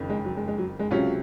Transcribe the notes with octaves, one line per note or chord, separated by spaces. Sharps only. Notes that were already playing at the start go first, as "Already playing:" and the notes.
Already playing: F#1 F2 D#3
G#3
F#3
G#3
G#3
F#3
G#3
C#2 C3 F#3 C#4 F4